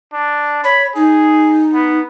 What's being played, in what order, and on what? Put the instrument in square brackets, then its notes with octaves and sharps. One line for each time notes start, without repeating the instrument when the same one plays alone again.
[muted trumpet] D4
[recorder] C#5 [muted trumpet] B5
[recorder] D#4 [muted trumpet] G#4
[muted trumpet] B3